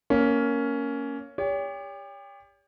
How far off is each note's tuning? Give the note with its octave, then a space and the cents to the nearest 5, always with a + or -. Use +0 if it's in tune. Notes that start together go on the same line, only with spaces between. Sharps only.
A#3 +0 C#4 +10
G4 +35 C#5 +40